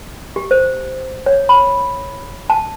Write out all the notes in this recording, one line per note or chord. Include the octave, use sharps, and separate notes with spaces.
G4
C5
C#5
B5
A5